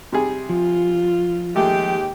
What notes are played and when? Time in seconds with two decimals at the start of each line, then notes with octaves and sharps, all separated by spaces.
0.12 C3 G3 G#4
0.49 F3 F4
1.56 D#2 G#3 A3 G4